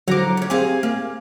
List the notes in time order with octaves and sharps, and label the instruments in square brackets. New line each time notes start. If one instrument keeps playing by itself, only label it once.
[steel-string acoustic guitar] D3 F3 [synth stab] F#3 A#5 D6
[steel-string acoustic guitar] F#2 C#4
[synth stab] C4 G4 [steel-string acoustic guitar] G#4 F5 G#5
[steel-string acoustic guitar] A#3 [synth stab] F5